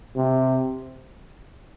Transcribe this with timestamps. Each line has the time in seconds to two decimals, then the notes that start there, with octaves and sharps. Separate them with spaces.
0.16 C3